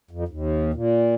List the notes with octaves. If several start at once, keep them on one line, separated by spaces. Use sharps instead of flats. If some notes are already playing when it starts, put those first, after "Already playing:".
F2
D#2
A#2